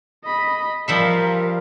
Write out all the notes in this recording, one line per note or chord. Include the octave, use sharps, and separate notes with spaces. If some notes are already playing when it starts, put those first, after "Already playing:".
D#5 B5
F3 G3 A#4 E5 F5